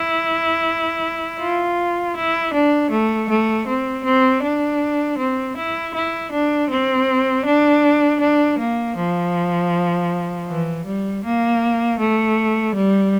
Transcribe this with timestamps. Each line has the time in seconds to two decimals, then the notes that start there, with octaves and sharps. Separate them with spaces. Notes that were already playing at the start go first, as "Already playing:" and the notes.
Already playing: E4
1.40 F4
2.16 E4
2.54 D4
2.91 A3
3.29 A3
3.67 C4
4.04 C4
4.43 D4
5.18 C4
5.57 E4
5.94 E4
6.32 D4
6.70 C4
7.45 D4
8.20 D4
8.59 A#3
8.96 F3
10.48 E3
10.86 G3
11.24 A#3
11.99 A3
12.75 G3